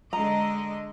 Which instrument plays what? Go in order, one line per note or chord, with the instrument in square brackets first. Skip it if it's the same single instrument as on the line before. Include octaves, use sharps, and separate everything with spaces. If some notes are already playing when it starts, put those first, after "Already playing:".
[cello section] D3 G#3 D#5 [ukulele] A#5